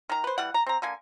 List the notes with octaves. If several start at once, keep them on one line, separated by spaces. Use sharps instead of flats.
D#3 A#5
B4 C5
E3 G3 F#5
A#5
C4 A#5
D3 A#3 G#5